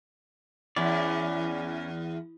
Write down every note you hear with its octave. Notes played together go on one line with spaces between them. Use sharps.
E2 C#4 E4 D5